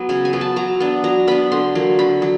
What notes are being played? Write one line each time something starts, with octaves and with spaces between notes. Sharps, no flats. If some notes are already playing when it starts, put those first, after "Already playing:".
Already playing: F#3 B3
C#3 G#5
G#5
F#3 B3
A5
F#3 A#5
B3 D4
F#3 A#5
B3 D4 B5
D3 C6
F#3 A#3
D3 B5
F#3